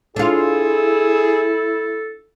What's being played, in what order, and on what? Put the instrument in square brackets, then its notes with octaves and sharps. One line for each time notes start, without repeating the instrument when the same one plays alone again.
[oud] D4 F4 [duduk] E4 [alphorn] G#4 [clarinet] A4